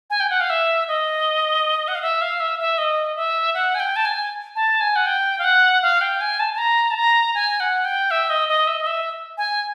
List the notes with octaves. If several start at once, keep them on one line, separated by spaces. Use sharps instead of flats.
G#5
G5
F#5
F5
E5
D#5
F#5
F5
E5
F5
E5
E5
D#5
E5
F#5
G#5
G5
A5
G#5
A5
G#5
F#5
G5
F5
F#5
F5
G5
G#5
A5
A5
A#5
A5
A#5
G#5
F#5
G5
E5
D#5
D#5
E5
D#5
E5
G#5